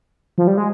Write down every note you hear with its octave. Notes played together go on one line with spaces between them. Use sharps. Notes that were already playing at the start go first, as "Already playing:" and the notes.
F3
G3
G#3